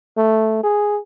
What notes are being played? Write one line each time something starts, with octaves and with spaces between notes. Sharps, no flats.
A3
G#4